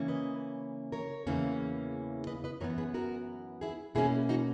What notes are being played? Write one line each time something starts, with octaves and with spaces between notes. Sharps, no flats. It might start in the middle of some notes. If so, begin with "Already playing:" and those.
Already playing: C#3 E3 A#3 C#4
B4 D#5
A#4 C#5
E2 C#3 E3 A#3 C#4
B4 D#5
B4 D#5
F#2 E3 B3 A#4 C#5
G#4 B4
F#4 A#4
E4 G#4
B2 A#3 C#4 E4 G#4
D#4 F#4